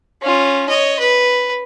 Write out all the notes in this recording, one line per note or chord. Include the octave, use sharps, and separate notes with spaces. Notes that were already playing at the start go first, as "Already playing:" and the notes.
C#4 F4
C#5 D#5
B4